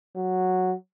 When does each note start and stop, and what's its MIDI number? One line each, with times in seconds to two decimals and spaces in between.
0.16 0.73 54